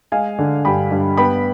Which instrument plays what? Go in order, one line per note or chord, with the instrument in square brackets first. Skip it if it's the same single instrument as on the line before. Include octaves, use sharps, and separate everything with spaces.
[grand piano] G#3 F5 G#5
D3
G2 G5 B5
G2
B3 G5 B5